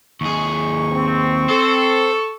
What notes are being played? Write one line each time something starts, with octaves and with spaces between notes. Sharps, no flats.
D#2 G#4 C#6
C4
A4 C5